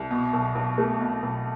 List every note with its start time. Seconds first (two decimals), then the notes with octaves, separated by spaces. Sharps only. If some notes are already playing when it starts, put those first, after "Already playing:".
Already playing: C2
0.10 B2
0.33 B1
0.55 B1
0.78 A3
1.00 B2
1.22 B1